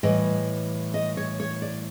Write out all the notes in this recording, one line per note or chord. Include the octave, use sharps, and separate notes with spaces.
A2 E3 G3 D#5
D#5
C#5
C#5
D5